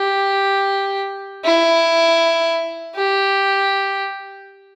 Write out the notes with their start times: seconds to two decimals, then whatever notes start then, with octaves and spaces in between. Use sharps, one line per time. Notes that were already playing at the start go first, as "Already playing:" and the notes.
Already playing: G4
1.44 E4
2.95 G4